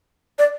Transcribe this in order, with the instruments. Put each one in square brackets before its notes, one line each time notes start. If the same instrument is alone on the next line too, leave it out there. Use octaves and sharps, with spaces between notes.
[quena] D5